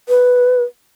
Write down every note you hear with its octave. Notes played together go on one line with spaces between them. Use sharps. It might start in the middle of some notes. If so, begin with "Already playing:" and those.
B4